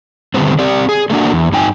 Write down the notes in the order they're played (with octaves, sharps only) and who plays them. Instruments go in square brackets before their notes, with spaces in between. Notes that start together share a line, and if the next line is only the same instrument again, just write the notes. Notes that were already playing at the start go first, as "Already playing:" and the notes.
[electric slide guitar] D3 D#3 G3 B3 C4
C4 G4 D5
G#4
A3 A#3 D4 F#4
E2
G2 D#4 G5 G#5